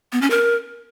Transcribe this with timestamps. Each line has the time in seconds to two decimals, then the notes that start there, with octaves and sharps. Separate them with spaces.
0.12 B3
0.21 C#4
0.30 A#4